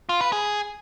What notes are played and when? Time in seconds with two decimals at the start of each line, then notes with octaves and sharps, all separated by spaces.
0.09 F4
0.21 B4
0.32 G#4